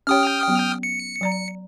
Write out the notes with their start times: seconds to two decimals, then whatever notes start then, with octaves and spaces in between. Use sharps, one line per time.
0.07 C#4 G4 C#5 G5 D#6 F6
0.48 F#3 B3
0.83 C#7
1.21 F#3 D5 A#5